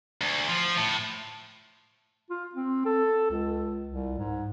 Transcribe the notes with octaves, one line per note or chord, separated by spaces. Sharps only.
D2
F3
A2
F4
C4
A4
C#2
C2
G#2